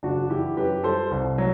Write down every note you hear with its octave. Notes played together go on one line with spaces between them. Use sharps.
F#1 D4 F#4
E3 E4 G4
F#2 G4 B4
G3 A4 C5
C2
F#3